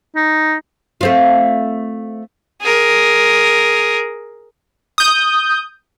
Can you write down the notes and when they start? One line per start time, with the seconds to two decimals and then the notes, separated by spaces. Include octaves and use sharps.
0.16 D#4
1.01 A3 C4 F4
2.62 G#4 A#4
4.98 D#6 G6